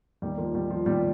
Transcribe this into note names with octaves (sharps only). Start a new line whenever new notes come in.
D#2 D#3 G3
F3 A#3
G3
F3
D#2 D#3 G3